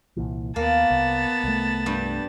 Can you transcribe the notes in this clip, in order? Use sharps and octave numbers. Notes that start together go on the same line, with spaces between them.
C2 A#2 E3
D#2 A#3 B3 A5
C2
C2 A3
G2 G3